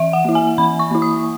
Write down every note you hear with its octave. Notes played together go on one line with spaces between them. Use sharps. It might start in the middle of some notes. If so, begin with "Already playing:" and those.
Already playing: E3 E5
F#5
A#3 E4
G#5
E3 B5
C#6
A#3 E4
D#6